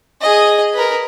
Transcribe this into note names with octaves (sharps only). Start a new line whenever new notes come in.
G#4 D#5
A#4 B4